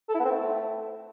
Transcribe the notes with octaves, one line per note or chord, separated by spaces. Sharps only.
A4
E4
B3
C4
A3